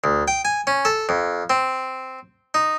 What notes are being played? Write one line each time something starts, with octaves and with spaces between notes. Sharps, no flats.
D2
G5
G#5
C#4
A4
F2
C4
D#4